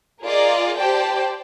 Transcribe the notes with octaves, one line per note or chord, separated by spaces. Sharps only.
F4 G#4 A#4 D5 D#5
G4 C5 D5 G5 A5